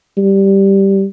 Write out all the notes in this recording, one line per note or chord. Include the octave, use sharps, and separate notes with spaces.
G3